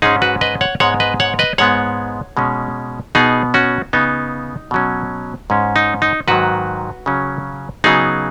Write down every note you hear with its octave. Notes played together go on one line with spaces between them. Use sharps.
G#2 G#3 C#4 D#4 G#4
F#4 B4
B4 D#5
C#5 F#5
G#2 G#3 B3 C#5 F#5
B4 D#5
C#5 F#5
B4 D#5
G#2 G#3 B3 C#5 F#5
B2 G#3 C#4
B2 B3 D#4 G#4
C#4 F#4
C#3 B3 D#4
B2 F#3 C#4
G#2 G#3 C#4
D#4
D#4
G#2 D#3 F#3 F#4 B4
C#3 F#3 C#4
C#3 F#3 B3 D#4 G#4